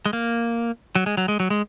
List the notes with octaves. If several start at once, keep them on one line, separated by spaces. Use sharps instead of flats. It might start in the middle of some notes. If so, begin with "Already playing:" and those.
G#3
A#3
F#3
G#3
F#3
G#3
F#3
G#3